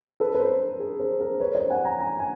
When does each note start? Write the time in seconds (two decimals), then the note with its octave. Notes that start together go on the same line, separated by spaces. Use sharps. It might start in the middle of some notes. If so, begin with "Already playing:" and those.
0.20 A4 B4
0.35 B4
0.40 A#4 C5
0.79 G#4 A#4
0.99 A#4 C5
1.20 A#4 C5
1.40 B4 C#5
1.55 C5 D5
1.70 F#5 G#5
1.85 G#5 A#5
2.00 G#5 A#5
2.19 G#5